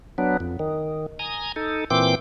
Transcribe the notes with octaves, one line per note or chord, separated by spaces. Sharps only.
F#3 B3 D4
F2
D#3
G#5 A#5 D#6
D#4 A4
A#2 E3 C4 G5 D6